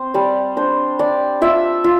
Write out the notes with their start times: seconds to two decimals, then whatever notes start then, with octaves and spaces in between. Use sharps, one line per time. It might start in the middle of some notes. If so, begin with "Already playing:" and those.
Already playing: C4 C5
0.14 G3 D5
0.57 D4 C5
0.99 D4 D5
1.41 F4 E5
1.84 F4